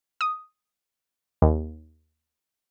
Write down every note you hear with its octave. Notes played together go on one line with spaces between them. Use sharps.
D#6
D#2